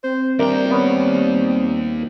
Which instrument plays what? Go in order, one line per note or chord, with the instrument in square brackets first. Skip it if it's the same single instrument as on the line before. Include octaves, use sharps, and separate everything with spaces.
[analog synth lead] C4 [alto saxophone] C5
[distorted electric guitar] D#2 G5 [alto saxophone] G3 [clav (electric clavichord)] D4 A#4 E5
[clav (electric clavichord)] B3 C#4